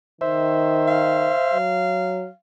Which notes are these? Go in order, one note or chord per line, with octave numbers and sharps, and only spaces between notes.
D#3 C5 E5
F5
F#3